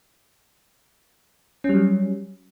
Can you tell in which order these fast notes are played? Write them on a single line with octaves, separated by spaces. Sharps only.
C#4 G3 F#3